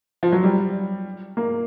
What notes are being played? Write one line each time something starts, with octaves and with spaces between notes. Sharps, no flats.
F3
F#3
G3
A#3